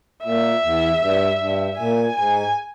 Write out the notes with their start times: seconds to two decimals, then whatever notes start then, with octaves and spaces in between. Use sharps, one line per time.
0.23 A#2 E5
0.63 E2
1.01 G2
1.39 G2
1.77 A#2 G#5
2.16 G#2 G#5